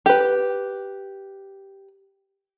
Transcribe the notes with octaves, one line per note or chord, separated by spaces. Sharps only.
G4 B4